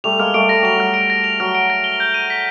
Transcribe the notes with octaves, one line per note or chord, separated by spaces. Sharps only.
G3 A3 F7
G#3 A#3 F6
G3 A3 D7
G3 A#6
F#3 F7
G3 F6
D7
A#6
F7
F#3 F6
D7
A#6
G7
G6
D#7
B6